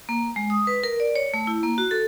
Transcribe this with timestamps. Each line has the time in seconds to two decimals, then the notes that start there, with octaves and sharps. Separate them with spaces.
0.09 A#3
0.36 G#3
0.50 D#6
0.67 B4
0.84 A#4
1.00 D5
1.16 C#5
1.34 A3
1.47 E4
1.63 A#3
1.78 F#4
1.91 A4